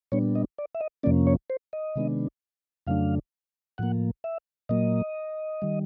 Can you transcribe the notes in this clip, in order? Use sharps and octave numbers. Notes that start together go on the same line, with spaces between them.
A#2 G3 B3 D4 C#5
D#5
D5
E5
D#5
F2 C3 F3 A#3 C#4 D5
C#5
C5
D#5
C3 D#3 G#3 B3 D4
F2 C#3 F#3 A3 D4 F5
A2 F3 A#3 F#5
E5
A#2 F#3 A#3 D#5
D#3 G3